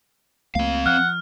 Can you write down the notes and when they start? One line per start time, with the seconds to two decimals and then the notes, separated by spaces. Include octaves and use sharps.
0.55 C#2 A3 A#3 C4 F5
0.86 F3 F#5 F6